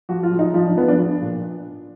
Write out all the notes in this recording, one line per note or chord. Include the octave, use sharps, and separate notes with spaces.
F3 F#4
F4
F3
D#4
F3 D#4
D4
F3 B3
D4
F3
A#2